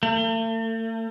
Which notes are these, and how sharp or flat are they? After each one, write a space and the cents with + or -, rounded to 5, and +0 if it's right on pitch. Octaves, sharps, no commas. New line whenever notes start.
A3 +45